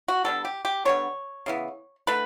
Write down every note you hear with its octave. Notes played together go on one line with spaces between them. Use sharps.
F#4
D3 G3 B3 A4
G4
G4
D3 G3 B3 C#5
C#3 E3 B3
D3 A3 B4